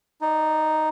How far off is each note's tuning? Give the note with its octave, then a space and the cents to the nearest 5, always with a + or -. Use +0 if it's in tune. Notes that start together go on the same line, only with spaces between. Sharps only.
D#4 +0 D5 +25